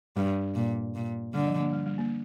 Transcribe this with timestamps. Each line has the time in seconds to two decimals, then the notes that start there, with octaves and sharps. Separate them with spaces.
0.16 G2 G3
0.55 A#2
0.95 A#2
1.34 D3 G3
1.47 F3
1.59 A#3
1.73 G3
1.86 G3
1.98 A#3